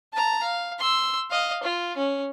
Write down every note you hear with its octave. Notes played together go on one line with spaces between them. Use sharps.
A5 A#5
F5
C6 E6
D#5 F5
F4
C#4